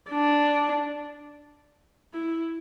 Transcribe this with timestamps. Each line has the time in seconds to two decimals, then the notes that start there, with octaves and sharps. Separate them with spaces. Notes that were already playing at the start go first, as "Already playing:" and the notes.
0.10 D4
2.14 E4